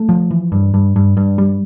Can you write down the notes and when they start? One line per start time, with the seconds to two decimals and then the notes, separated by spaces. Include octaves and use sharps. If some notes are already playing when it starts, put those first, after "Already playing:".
Already playing: A3
0.09 F3
0.31 E3
0.52 G2
0.74 G2
0.96 G2
1.17 G2
1.38 G3